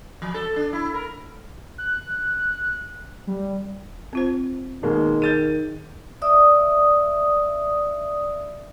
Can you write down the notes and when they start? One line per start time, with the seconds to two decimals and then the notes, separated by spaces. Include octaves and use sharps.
0.22 F3
0.34 A4
0.56 D4
0.73 E4
0.94 A#4
1.78 F#6
3.27 G3
4.13 C4 F4 C5
4.83 B2 D#3 G#3 A#3
5.22 G#4 G6 A6 D#7
6.22 D5 E5 D#6 E6